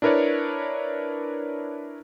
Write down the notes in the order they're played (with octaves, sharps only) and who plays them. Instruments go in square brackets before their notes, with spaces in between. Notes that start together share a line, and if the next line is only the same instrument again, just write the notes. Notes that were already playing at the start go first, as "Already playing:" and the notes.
[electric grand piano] D4 E4 A#4 B4 C#5 D5